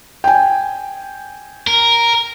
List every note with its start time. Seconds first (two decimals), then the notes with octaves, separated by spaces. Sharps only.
0.24 G5 G#5
1.67 A#4